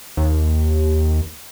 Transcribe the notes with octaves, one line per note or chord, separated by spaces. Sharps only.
D#2